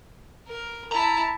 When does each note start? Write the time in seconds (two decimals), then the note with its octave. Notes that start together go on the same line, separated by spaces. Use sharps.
0.48 A#4
0.92 E4 A5 A#5